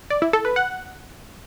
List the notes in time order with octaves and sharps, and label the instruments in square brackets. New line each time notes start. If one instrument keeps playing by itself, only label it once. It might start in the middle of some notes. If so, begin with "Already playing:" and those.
[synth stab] D5
E4
A4
B4
F#5